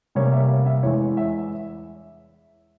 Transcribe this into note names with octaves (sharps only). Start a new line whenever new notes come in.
C3 G3 A#3 C#4 C#5
E5
F5
E5
E2 E3 G#3 C#5
E5